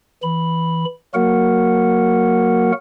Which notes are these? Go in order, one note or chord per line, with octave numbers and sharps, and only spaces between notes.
E3 B5
F#3 A#3 F#4 A#4 F#5